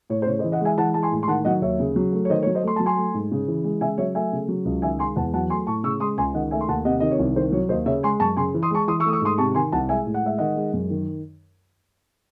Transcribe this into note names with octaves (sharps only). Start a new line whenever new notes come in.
A2 C#5
C5
C#3 C#5
C5 D#5
E3
D#5 F#5
G#3 E5 G#5
E3 F#5 A5
G#3 A5
G#5 C6
A2
C6
D#3 F#5 A5
F#3 D#5 F#5
D#2 C#5 E5
C#3
F#3
A3
C#5
D#3 C5 D#5
C#5
F#3
C5 D#5
A3 C6
F#3 A5
G#5 C6
A3
G#2
C#3
E3
G#3
C#3 E5 G#5
F#3 C#5 E5
A3 E5 G#5
C#3
F#3
C#2
D#3 E5 G#5
G#3 G#5 C6
E2 F#5 A5
F#3 F#5 A5
A3 G#5 C6
A2 A5 C#6
C#3 C#6 E6
G#3 C6 D#6
C#2 G#5 C6
D#3 D#5 F#5
A3 E5 G#5
C6
D#2 F#5 A5
C3 D#5 F#5
D#3 D#5
C#5
C2
D#3 C5
F#3 C#5
D#2 C5 D#5
C#3 C#5 E5
G#3 G#5 C6
F#2 A5 C#6
C#3 G#5 C6
E3
C6 D#6
G#3 A5 C#6
E3 C6 D#6
C#6 E6
A3 D#6
C#6 E6
G#2 C6 D#6
C3 A5 C#6
D#3 G#5 C6
C2 F#5 A5
G#3 E5 G#5
A2
F#5
G#3 E5
D#3 D#5 F#5
G#3
F#2
D#3